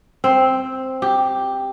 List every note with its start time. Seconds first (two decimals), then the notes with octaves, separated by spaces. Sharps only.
0.24 C4
1.02 G4